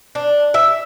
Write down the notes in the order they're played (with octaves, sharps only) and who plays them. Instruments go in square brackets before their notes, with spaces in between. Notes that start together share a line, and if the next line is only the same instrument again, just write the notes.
[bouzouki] D4
E5